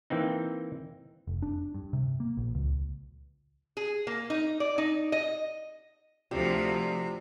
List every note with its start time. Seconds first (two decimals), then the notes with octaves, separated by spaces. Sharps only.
0.10 E3 A#3 C4 D#4
1.27 F1
1.42 D4
1.74 G2
1.93 C3
2.20 A#3
2.37 A#1
2.55 C#2
3.77 G#4
4.07 A#3
4.30 D#4
4.60 D5
4.78 D#4
5.12 D#5
6.31 D2 C3 F3 F4 G4 D5